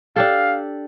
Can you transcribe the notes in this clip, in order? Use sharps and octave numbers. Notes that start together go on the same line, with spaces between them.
D4 G4 A4 F5